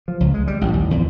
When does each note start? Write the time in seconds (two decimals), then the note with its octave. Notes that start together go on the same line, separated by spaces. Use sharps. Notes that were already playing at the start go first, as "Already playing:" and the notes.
0.08 F3
0.20 C#2
0.34 G#3
0.47 G3
0.61 A1
0.73 D#2
0.91 E2